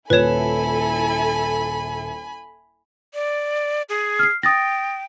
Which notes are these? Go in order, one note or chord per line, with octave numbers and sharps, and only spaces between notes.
D#1 E4 A4 B4 C#5 G#5 B5 E7
D5
G#4
F6 C7
G5 D#6 A6 A#6